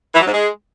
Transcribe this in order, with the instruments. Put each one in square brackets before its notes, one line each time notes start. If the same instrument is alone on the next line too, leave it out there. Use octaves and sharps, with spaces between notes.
[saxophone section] E3
F#3
G#2
G#3